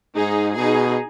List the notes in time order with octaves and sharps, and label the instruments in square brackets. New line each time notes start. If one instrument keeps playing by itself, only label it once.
[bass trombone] G#2 [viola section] D#4 G#4
[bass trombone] B2 [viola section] D#4 G#4